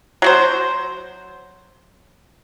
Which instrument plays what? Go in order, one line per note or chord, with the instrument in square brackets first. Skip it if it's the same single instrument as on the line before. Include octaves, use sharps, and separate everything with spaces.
[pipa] F#3 F#4 C5